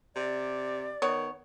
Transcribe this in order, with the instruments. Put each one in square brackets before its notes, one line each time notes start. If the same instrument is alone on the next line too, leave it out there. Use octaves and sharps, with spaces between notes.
[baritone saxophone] C3 [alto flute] D5
[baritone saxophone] D#3 [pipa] B3 C#5